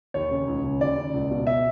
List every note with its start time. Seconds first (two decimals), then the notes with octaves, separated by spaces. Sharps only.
0.14 D#2 C#5
0.31 C#3
0.48 C#2
0.64 C#3
0.81 D#2 D5
0.97 C#3
1.14 C#2
1.31 B2
1.47 E5